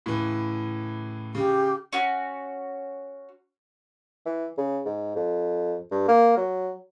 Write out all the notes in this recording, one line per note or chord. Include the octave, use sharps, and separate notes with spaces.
A2 C#3 E3
C#3 G4
C#4 F#4
E3
C#3
G#2
F2
G2
A#3
F#3